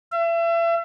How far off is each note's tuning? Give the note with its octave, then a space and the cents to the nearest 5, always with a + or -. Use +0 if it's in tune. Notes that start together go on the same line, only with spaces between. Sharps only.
E5 +35